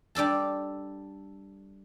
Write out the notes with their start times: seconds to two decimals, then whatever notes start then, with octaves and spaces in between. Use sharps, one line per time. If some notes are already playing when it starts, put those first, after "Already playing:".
0.15 G3 D4 A4 A5